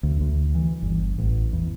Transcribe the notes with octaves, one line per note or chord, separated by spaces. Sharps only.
D2
D2
E3
G1
A1
E2